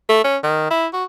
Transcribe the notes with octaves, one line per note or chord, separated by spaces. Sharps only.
A3
C#4
D#3
E4
F#4